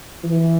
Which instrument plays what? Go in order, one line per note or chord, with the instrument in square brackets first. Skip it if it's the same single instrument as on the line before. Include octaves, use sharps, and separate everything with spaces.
[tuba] E3